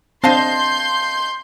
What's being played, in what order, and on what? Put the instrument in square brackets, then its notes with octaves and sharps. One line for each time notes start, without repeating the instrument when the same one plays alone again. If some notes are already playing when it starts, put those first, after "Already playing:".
[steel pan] C4 D4 [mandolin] D#5 F5 A5 [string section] C6 G6